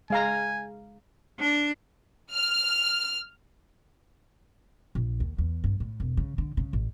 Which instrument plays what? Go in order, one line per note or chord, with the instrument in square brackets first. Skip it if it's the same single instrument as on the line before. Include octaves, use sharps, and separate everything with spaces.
[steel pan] G#3 F5 A#5 [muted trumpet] G#5
[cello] D4
[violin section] F6
[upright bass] A#1
D#2
E2
G2
A2
E1
C#3
D3
C#3
A1